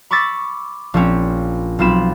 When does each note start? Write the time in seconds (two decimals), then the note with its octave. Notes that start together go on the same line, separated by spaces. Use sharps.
0.11 B5 C#6 D6 E6 A6 B6
0.94 A#1 C4 C#4
1.79 B1 C4 F4 B5 E7